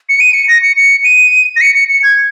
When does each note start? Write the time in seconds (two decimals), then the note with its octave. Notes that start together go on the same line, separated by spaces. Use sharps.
0.09 C#7
0.20 D#7
0.33 C#7
0.48 A#6
0.63 C#7
0.77 C#7
1.04 D#7
1.56 A#6
1.61 C#7
1.75 C#7
1.90 C#7
2.03 G#6